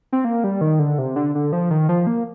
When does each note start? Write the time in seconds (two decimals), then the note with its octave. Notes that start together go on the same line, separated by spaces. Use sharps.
0.12 C4
0.25 A#3
0.44 G3
0.61 D#3
0.79 D3
0.98 C3
1.16 D3
1.35 D3
1.53 F3
1.71 D#3
1.89 F3
2.07 A#3